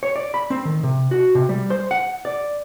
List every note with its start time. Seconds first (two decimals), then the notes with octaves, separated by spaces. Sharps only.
0.03 C#5
0.16 D5
0.34 B5
0.50 C4
0.65 D#3
0.83 C3
1.11 F#4
1.35 C3
1.49 G3
1.70 C5
1.91 F#5
2.25 D5